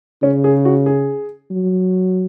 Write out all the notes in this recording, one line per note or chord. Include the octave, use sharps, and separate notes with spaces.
C#3 C#4
G#4
F#4
G#4
F#3